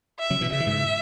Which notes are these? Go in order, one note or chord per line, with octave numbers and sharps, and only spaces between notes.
E5
C#3 F#3
B2 E3
C#3 E5
E3
G#2 C#3